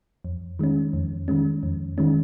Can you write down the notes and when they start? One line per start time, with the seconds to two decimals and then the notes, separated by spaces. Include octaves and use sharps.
0.25 F2
0.59 D#3 G#3 C#4
0.93 F2
1.28 D#3 G#3 C#4
1.63 F2
1.98 D#3 G#3 C#4